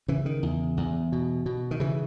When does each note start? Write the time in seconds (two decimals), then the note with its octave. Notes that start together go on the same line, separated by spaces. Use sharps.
0.08 C#3 E3
0.26 D#3
0.43 E2
0.77 E2
1.12 B2
1.46 B2
1.71 D#3
1.80 C#3 E3